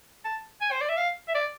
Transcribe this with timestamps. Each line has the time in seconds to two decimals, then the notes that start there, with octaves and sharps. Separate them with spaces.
0.25 A5
0.61 G#5
0.71 C5
0.81 D5
0.89 E5
0.97 F5
1.28 E5
1.35 D5